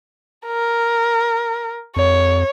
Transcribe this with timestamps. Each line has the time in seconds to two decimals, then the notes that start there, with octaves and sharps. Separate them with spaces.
0.47 A#4
1.96 F2 C#5